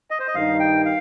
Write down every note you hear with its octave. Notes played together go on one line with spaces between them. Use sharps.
D#5
C5
D#5
G2 D#3 G3 D#4 A#4 F5
G5
F5